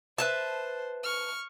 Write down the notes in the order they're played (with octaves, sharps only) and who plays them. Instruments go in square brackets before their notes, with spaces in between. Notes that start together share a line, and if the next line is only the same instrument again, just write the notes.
[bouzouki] B4 E5 A5 [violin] C5
[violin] C#6 F6